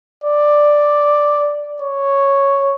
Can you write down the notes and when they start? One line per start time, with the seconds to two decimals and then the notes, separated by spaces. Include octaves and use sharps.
0.24 D5
1.82 C#5